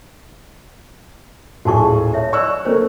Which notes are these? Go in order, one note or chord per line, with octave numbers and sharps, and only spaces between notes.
D#1 A2 F#4 G#4 A5 C#6
C#5 E5
D5 C#6 E6 F#6
A3 A#3 C5